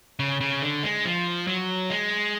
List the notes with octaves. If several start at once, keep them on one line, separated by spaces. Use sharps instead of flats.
C#3
C#3
D3
G#3
F3
F#3
G#3